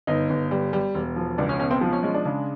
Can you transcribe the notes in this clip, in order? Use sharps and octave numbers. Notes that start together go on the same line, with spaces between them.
G1 D#4
G1
G3
G3
E1
F3
C#2 D4
C#4
B2 C#4
C4
F3
C#4
G#3 C#4
D4
C#3 D4